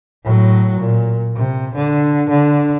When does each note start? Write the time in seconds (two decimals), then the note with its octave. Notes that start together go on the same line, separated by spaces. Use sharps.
0.24 A2 F#3
0.80 A#2
1.36 C3
1.75 D3
2.30 D3